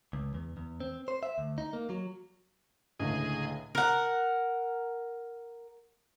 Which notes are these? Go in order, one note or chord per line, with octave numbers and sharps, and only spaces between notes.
C#2
E2
E2
C4
C5
E5
D2
D#4
A#3
F#3
C#2 A2 D3 G#4 D#5
A#4 F#5